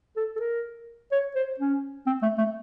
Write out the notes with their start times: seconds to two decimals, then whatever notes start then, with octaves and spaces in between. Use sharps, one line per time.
0.16 A4
0.36 A4
0.40 A#4
1.12 C#5
1.35 C5
1.59 C#4
2.06 C4
2.23 A3
2.38 A3